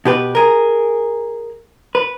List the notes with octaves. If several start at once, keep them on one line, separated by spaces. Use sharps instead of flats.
B2 G4 B4
G#4 A#4
B4